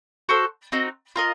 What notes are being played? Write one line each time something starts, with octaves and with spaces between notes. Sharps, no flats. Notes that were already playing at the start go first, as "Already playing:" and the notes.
F#4 A4 C5
C4 D#4 F#4
F4 A#4 D#5